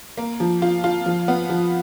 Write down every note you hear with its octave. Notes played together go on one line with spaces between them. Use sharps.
A#3
F3
F4
F4
F3
B3
F3